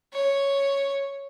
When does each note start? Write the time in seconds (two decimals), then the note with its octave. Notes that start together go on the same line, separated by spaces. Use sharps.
0.13 C#5